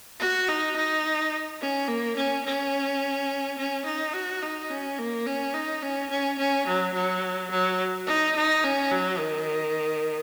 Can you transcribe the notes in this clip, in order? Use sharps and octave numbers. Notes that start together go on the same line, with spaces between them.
F#4
D#4
D#4
C#4
A#3
C#4
C#4
C#4
D#4
F#4
D#4
C#4
A#3
C#4
D#4
C#4
C#4
C#4
F#3
F#3
F#3
D#4
D#4
C#4
F#3
D#3